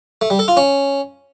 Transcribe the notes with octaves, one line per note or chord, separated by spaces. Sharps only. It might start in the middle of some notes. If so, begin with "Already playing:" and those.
A3
G3
A4
F4
C#4